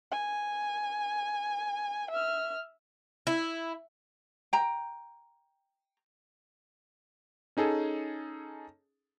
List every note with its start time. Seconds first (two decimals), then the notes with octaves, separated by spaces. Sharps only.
0.11 G#5
2.11 E5 F6
3.27 E4
4.53 G5 A#5
7.57 C#4 D#4 G#4 A4